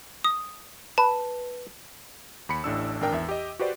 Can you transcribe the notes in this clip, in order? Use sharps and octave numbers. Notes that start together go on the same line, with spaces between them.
D#6
B4 A5
D#2 B5 C#7
A1 A2 D4 E6
G#1 D4 A#4 G5
E2 E5
G4 D#5
F#4 G4 B4 C5 D5